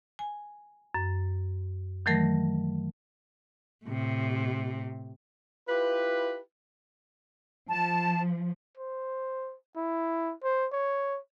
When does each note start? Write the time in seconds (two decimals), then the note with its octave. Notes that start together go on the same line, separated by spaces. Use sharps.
0.19 G#5
0.94 F#2
2.06 D#3 E3 F#3 A3 A#4 A#6
3.85 A2 C3
5.69 E4 F4 G4 B4
7.68 F3 A5
8.78 C5
9.76 E4
10.44 C5
10.73 C#5